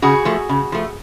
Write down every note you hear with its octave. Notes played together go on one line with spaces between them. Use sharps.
C#3 F#4 G#4
F3 A3
C#3
F3 A3